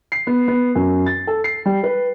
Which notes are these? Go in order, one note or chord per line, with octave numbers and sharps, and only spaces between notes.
C7
B3
B3
F#2
A6
A4
C7
G3
B4